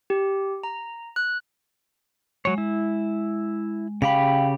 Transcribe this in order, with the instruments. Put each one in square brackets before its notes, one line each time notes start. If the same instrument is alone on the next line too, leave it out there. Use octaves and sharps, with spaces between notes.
[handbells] G4
A#5
F#6
[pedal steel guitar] F#3 C#5 [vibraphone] G#3
[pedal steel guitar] E4
[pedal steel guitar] C#3 G4 B5 [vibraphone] F5 G5